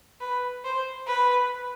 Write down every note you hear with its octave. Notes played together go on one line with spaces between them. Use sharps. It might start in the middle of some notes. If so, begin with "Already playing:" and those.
B4
C5
B4